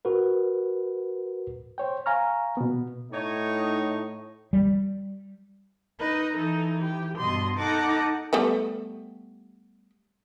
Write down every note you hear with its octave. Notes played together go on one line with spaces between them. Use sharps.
F#4 A#4 B4
C5 C#5 G5
F5 G#5 A#5 C#6 F6
B2 B3
A2 D#4 C#5
G3
D#4 B4 D#5
E3 D#4 A4
G4
G2 B2 D#5 C6
D#4 A4 F#5 D6
G3 A3 B3